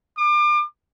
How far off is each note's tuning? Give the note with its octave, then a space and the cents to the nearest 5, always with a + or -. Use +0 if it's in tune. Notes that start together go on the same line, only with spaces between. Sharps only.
D6 +35